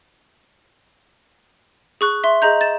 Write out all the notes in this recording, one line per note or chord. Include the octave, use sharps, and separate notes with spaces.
G#4 C#6 F#6
E5 C6
G#4 D#5 A#5 G6
A6 E7